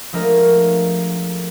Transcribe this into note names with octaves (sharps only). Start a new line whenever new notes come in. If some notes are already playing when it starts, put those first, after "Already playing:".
F3 G#3 A3 D4 A#4 D#5